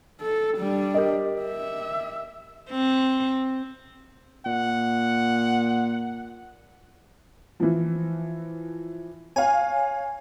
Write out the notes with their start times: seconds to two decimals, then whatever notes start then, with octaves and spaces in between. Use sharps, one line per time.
0.21 A4
0.58 G3 D4
0.95 G4 A#4 D#5
1.42 E5
2.70 C4
4.46 A#2 F#5
7.60 E3 F3
9.36 C#5 F5 G#5